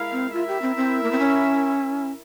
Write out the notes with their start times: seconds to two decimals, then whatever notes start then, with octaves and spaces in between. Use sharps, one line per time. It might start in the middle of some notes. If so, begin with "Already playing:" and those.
Already playing: G#3 E4 A#4 F5
0.12 C4
0.34 E4 F4 A#4 E5
0.48 G4
0.62 C4
0.76 C4
1.03 A#3
1.11 C4
1.19 C#4